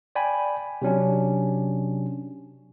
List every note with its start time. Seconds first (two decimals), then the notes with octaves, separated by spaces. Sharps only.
0.15 D5 G5 G#5 B5
0.82 C3 F#3 C#4 D4